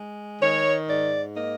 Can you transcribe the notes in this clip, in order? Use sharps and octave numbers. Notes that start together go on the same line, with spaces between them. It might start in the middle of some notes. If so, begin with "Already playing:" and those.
Already playing: G#3
D#3 C#5
G#2 D5
A#3 D#5